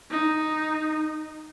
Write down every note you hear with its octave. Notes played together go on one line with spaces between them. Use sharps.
D#4